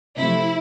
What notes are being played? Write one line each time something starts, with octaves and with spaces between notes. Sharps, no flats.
C3 F3 A3 E4